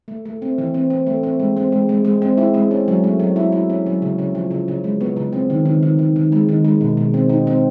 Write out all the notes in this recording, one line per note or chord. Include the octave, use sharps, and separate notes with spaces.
A3
A3
C4
E3
C4
C4
A3
C4
G#3
C4
G#3
G#3
G#3
C4
E4
G#3
C#4
F#3
A3
F#3
E4
E4
C#4
F#3
C#3
C#3
F3
C#3
C#3
G#3
B3
C#3
C4
D#3
D#3
D#3
D#3
D#3
G#3
D#3
G#3
B2
B2
C4
D#4
C4